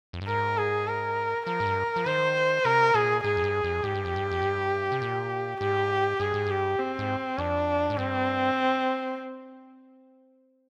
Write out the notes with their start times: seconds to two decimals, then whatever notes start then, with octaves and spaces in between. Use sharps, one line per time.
0.13 F2
0.21 G2
0.28 G#2 A#4
0.57 G#4
0.87 A#4
1.47 F3 A#4
1.60 G#2
1.66 G2
1.96 F3
2.06 D#3 C5
2.65 C3 A#4
2.94 A#2 G#4
3.24 G#2 G#4
3.37 F2
3.44 G2
3.64 F2
3.83 G#2 G4
3.95 G2
4.05 F2
4.16 G2
4.31 F2
4.42 G2
4.92 C3
5.02 A#2
5.61 G#2 G4
6.20 G2 G#4
6.34 G#2
6.46 G2 G4
6.79 C4
6.99 G#2
7.38 F2 D4
7.90 G#2
7.98 G2 C4